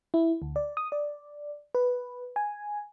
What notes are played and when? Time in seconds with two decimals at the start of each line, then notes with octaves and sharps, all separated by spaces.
0.14 E4
0.42 D2
0.56 D5
0.77 D#6
0.92 D5
1.75 B4
2.36 G#5